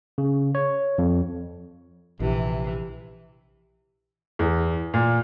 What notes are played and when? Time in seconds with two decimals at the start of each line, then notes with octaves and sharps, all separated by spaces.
0.18 C#3
0.55 C#5
0.98 F2
2.20 A#1 C3 E3
4.39 E2
4.94 A#2